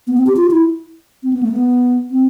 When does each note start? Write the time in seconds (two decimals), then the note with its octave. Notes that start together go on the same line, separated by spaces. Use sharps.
0.07 B3
0.17 C4
0.27 G4
0.36 F4
0.51 E4
1.23 C4
1.33 B3
1.43 A3
1.52 B3
2.11 C4